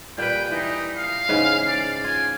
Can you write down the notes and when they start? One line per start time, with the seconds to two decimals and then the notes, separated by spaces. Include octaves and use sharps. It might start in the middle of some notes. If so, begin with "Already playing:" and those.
0.18 A#2 G3 B4 G5
0.51 E3 D#4
0.97 F5
1.29 G#2 C#3 E3
1.68 D5
2.04 F4 G#5